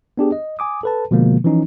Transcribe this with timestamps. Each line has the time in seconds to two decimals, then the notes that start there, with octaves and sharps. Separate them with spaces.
0.18 B3 D4 G4 G#4
0.32 D#5
0.59 G#5 D6 D#6
0.83 A4 B4 A5
1.11 B2 D3 F3 G#3 A#3
1.44 E3 F3 C#4 D#4